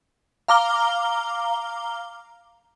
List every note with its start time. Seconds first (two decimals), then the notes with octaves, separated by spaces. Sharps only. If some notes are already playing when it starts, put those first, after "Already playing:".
0.48 F5 A#5 D6 F6 G7